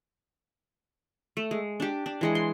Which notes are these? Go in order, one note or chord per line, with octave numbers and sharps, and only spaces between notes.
A3
G#3
D4 G4
D4
E3 G#3 F#5
C6